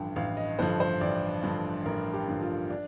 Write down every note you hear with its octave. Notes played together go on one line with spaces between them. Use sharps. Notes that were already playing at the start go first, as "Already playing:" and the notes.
Already playing: A1 G2 D3 F3 G5
A1 F5
D#5
G2 D3 F3 C5
C5
A1 D5
G2 D3 F3
A1 A#4
G4
G2 D3 F3
F4
D4